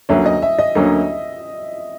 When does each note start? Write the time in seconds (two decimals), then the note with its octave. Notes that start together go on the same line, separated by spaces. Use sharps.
0.09 D2 D3 F#3 A#3 C#4 E5
0.26 D#5
0.42 E5
0.59 D#5
0.75 D2 D3 F#3 A#3 C#4